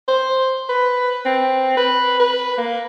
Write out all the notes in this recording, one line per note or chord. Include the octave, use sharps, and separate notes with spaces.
C5
B4
C4
B4
B4
A#3